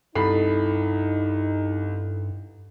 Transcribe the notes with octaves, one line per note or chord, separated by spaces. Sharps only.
C2 G2 D#4 E4 A4 B5 C7